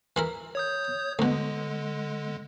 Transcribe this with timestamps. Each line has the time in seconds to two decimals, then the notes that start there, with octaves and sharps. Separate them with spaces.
0.16 E3 E4 A#4
0.55 C#5 D#6 G6
1.19 D2 B2 D3 G#3